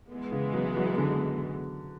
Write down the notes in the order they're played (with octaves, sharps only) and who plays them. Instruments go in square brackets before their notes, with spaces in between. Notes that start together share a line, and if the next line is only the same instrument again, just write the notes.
[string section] E3 G#3 B3
[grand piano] C#3
F#3
F#3
D3